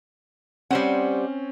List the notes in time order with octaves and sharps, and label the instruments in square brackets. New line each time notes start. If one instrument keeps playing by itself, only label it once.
[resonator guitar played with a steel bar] G3 C5 F#5 [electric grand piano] C4 C#4